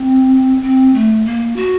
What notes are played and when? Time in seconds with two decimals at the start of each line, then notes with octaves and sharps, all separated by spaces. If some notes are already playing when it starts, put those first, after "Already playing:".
Already playing: C4
0.63 C4
0.94 A3
1.25 A#3
1.56 F#4